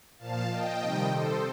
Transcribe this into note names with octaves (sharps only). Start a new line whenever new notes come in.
A#2 F3 F5 A5
D#5 G5
C3 D#3 G3
A4 C5